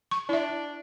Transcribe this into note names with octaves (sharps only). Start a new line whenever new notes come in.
C#6
D4 E4 E5